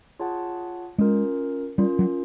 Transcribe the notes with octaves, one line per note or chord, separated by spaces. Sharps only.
F4 G#4 C#5 F#5 A5
G#3 C#4 F4 A#4
G3 C#4 F4 A#4
F#3